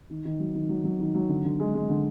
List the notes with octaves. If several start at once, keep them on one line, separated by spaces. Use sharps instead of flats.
D#3
D#3
F#3
D#3
F#3
F#3
D#3
F#3
D3
D3
G#3
G#3
D3